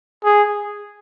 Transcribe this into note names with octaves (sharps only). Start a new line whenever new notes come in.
G#4